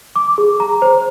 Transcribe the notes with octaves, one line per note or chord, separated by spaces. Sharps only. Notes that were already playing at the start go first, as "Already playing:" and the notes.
D6
G#4
A#5
C5